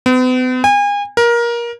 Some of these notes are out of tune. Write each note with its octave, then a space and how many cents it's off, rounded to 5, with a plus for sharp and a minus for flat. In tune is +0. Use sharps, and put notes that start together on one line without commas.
B3 +45
G#5 -35
A#4 +20